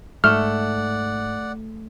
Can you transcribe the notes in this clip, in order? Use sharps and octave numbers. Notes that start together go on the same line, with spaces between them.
G#2 A3 D5 F#5 F6